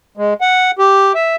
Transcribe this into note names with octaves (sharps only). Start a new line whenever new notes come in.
G#3
F#5
G4
E5